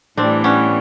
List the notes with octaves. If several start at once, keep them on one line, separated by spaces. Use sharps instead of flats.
A2 E3 G3 C4 D4
B3 C#4